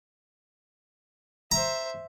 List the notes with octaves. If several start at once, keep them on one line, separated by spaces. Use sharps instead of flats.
C5 E5 A#5